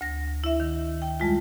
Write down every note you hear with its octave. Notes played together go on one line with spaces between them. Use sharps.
D2 A#6
E4 E5
D#3
G5
F2 G3 G#3 F4